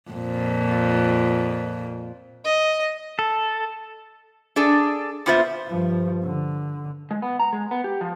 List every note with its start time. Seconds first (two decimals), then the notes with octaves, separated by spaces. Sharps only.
0.11 F2 A#2
2.45 D#5
3.19 A4
4.56 D4 G#4 A4 D5
5.26 A#2 B3 F4 C5 E5
5.67 G2 F3
6.23 D3
7.11 G#3
7.22 B3
7.40 A#5
7.53 G#3
7.71 B3
7.84 G4
8.01 F3